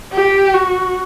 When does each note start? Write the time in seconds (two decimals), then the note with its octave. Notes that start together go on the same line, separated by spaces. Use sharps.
0.13 G4
0.54 F#4